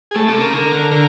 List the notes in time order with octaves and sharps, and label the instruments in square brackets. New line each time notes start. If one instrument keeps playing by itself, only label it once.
[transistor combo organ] G#4
[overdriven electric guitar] A2 [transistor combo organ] A4
[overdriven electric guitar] C3 [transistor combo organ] A4
[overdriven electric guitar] C#3 [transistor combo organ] A#4
[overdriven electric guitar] D3
D3
[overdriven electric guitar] D3 [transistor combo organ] A#4